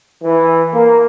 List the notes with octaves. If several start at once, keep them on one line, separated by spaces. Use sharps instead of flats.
E3
A#3